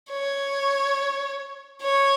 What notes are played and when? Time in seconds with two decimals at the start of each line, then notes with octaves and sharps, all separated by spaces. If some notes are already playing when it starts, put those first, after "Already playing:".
0.12 C#5
1.82 C#5